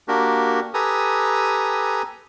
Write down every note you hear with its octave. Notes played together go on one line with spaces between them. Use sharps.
A#3 D4 F#4 G4 A#4
G4 A4 B4 G#5 A#5 D#6